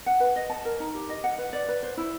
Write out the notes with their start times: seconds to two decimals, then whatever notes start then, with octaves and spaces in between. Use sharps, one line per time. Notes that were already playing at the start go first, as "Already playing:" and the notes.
0.06 F#5
0.20 B4
0.36 D#5
0.50 A5
0.65 A#4
0.80 D#4
0.95 G4
1.09 D#5
1.24 F#5
1.38 B4
1.53 D5
1.68 B4
1.83 C5
1.97 E4